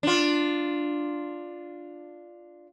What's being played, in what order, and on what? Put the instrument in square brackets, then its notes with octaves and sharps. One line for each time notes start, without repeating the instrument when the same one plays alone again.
[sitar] D4 F4